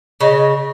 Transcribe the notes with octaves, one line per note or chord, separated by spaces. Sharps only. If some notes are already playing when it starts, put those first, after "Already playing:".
C#3 D#5